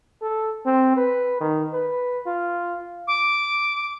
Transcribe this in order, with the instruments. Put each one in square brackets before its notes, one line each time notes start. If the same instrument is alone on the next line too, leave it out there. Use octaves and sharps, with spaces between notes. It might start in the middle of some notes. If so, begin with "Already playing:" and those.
[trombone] A4
C4
B4
D#3
B4
F4
[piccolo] D6